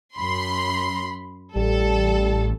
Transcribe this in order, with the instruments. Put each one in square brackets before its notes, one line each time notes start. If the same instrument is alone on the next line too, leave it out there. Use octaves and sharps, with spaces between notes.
[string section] F#2 B5 C6
[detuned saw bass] A1 [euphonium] G3 [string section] A4